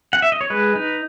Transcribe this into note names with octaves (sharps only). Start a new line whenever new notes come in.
F#5
E5
D#5
C#5
G#3 B4
D#4